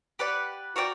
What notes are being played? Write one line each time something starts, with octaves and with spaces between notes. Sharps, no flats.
G4 B4 D5 F#5
F#4 A#4 D5 G5